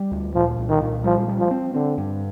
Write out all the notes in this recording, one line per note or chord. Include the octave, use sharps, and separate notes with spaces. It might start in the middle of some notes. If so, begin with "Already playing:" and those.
Already playing: G3
D2
A#2 F3
C2
D#3
A#2
F3 G3
G3
F3
C4
D3 C4
G2